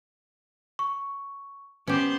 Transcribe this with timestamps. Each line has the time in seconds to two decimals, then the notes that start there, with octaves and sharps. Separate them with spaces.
0.79 C#6
1.87 B3 C#4 G4 C5